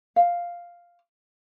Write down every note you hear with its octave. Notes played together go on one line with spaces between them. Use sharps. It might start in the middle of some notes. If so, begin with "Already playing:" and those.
F5